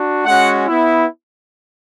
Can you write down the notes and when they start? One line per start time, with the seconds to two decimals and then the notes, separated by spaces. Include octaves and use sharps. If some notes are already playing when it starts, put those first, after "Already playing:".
Already playing: D4 F#4
0.26 G#3 C#4 F#4 F#5
0.66 B3 E4